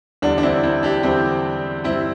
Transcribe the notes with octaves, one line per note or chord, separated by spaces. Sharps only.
E2 D3 G3 D4
D4
C4 E4
C4 E4
D4 G4
E2 D3 G3 C4 E4
G2 E3 G3 C4 E4